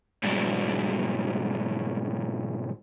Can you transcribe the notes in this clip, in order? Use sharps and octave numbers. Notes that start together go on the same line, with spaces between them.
G#2 B2 F#3 G3 D4 E4